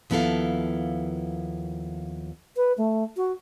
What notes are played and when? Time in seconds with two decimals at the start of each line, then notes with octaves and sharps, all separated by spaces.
0.10 D#2 F3 B3 E4 A4 F5
2.57 B4
2.78 A3
3.17 F#4